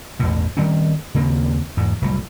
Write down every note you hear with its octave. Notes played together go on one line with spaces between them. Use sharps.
A1 E2 G2 B2
D#3 G3 C4 C#4
D#2 C#3 A#3 C4
E2 G#2
F1 C2 F#3